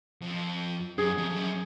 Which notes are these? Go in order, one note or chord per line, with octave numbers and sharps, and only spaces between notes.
F2
F#2 G#4
F2
F2
F#2